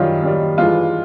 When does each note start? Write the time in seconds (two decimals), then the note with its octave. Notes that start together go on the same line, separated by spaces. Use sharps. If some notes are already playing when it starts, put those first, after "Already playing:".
Already playing: F#2 D#3 G3 F4
0.23 F#2 D#3 G3
0.58 G2 E3 G#3 F4